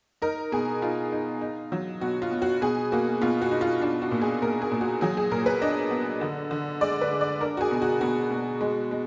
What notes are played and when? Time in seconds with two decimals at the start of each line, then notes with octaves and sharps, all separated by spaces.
0.22 D#4 A#4
0.52 B2 G#4
0.82 D#4 F4
1.12 D#4
1.41 D#4
1.72 F#3
2.01 B2 F#4
2.22 F4
2.31 B2
2.42 F#4
2.61 B2 G#4
2.92 A#3 F#4
3.21 B2 F4
3.42 F#4
3.51 D#4
3.61 F4
3.81 D4 F4
4.02 F#4
4.11 A#2
4.21 G#4
4.41 A#2 A#4
4.62 G#4
4.71 A#2
4.81 F#4
5.01 F#3 G#4
5.17 G#4
5.31 A#2 A#4
5.46 B4
5.62 D4 D#5
5.91 B3
6.21 D3
6.51 D3
6.81 G#3 D5
7.01 B4
7.11 G#3
7.21 D5
7.41 D4 A#4
7.57 F#4
7.61 G#4
7.71 B2
7.82 F#4
8.01 B2 F#4
8.31 B2
8.61 G#3
8.91 G#3